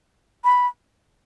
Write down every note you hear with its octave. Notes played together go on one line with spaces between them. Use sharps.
B5